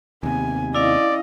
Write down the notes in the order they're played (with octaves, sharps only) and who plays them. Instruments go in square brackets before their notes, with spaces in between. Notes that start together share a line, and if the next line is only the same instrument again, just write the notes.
[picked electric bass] D#2 C3 [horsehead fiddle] B3 G#5
[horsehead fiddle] C#4 D#5 [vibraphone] E4 F5 [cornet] D5